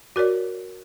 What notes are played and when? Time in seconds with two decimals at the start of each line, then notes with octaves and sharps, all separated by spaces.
0.16 F#4 A#4 C#5 D5